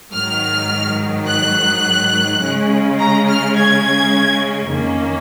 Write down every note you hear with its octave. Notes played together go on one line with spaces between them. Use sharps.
G#2 D#3 F#3 F6
F#6
C#3 G#3 C#4
A#5
F6
G#6
F2 D#3 A#3 C#4